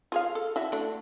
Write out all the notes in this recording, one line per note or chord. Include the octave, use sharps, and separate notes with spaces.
F4 G#4 F5
A4
E4 F#4 E5
A3 D4